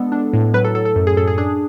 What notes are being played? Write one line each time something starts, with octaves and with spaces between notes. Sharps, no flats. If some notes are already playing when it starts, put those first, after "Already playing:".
Already playing: G#3 B3 D4 A4
D4
A2
F#3 B4
A4
F#3 A4
A4
F#2
G#4
F#2 A4
G#4
D4 G#4